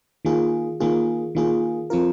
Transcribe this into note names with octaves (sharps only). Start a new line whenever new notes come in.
D#3 A#3 F4 G#4
D#3 A#3 F4 G#4
D#3 A#3 F4 G#4
F3 C4 F4 A#4